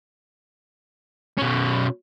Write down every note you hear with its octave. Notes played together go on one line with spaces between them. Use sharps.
B2 C#4